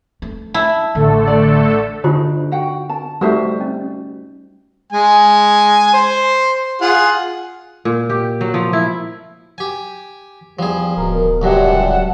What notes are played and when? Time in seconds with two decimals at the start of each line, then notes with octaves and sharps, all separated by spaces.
0.22 A3
0.54 E4 A5
0.95 A1 D3 A3 A4
1.27 D5
2.04 D3 D#4 F4 G4 C5
2.52 F#4 F#5 G5
2.89 A5
3.21 G3 A3 D#4 F#4 C5 E5
3.61 C#4
4.92 G#3 G#5
5.94 C5
6.81 F4 G#4 F#5
7.85 A#2
8.10 G4
8.41 F#3
8.54 F3
8.73 E4
9.58 G4 G#5
10.59 E2 F3 G3 G#4
10.97 D1 B2 A#4
11.42 C#2 F#2 A#2 G3 G#3 G4 F#5 A5